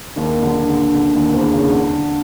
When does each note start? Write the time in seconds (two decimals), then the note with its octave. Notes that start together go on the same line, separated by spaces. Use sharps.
0.16 D#2 D#3
0.43 D3
0.69 D3
0.94 D3
1.15 D#2 D#3
1.34 E2 E3
1.53 C#3
1.73 D3